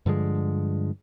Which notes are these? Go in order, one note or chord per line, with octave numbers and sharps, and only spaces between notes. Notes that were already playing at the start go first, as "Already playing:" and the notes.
G2 D3 F3 G#3